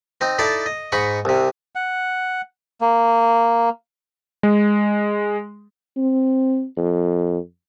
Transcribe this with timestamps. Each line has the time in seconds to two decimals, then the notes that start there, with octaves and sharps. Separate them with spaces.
0.21 C4 D#4
0.39 D#4 E4 A4 D5
0.66 D#5
0.92 G#2 D#4 F#5 B5 C#6
1.25 C2 C3
1.75 F#5
2.81 A#3
4.43 G#3
5.97 C4
6.77 F2